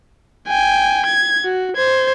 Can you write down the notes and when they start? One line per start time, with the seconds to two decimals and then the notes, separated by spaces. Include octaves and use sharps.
0.48 G5 G#5
1.06 G#6
1.44 F#4
1.76 C5 G#6